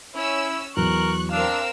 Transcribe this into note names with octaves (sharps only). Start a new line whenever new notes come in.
C#4 E4 E6
E2 F#3 A#4 C#6 F#6
C4 D4 A#4 F5 E6